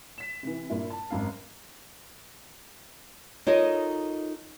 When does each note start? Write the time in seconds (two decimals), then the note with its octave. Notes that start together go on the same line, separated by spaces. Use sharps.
0.18 B6 E7
0.43 C3 E3
0.70 G2 A#2 A#3 E4
0.90 A5
1.10 G#1 F#2 F5
3.47 D#4 F4 A4 A#4 C#5 D#5